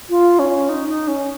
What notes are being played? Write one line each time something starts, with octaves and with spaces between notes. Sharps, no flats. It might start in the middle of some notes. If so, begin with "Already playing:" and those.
F4
C#4
D#4
D#4
C#4